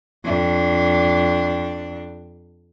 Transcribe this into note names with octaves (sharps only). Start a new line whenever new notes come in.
F2 D4